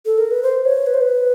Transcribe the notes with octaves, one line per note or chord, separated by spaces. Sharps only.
A4
A#4
B4
C5
C#5
B4
C5
B4